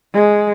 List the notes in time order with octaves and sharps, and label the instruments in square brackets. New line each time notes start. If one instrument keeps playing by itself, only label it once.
[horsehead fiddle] G#3